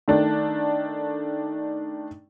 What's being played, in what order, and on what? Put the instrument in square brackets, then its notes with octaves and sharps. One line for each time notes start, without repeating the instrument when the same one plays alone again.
[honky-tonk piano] D#3 A3 D4